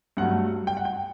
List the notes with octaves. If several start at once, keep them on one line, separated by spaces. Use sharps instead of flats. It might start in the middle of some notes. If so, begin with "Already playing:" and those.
G2 F#3 A3 F#5
G5
F#5
G5